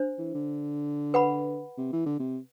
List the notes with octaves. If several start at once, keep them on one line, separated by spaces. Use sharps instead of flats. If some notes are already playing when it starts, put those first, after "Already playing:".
Already playing: D4 C5
E3
D3
B4 F#5 B5
C3
E3
D3
C3